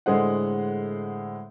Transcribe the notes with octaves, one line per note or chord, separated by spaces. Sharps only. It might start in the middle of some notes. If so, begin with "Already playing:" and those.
A2 D3 G#3 G#4 C5 F#5